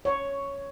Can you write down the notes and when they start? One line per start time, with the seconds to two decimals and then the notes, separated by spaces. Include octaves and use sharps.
0.05 C#5